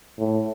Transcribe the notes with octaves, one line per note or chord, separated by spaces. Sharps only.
A2